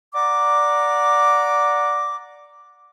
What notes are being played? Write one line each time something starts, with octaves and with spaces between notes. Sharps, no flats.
D5 F#5 A#5 D6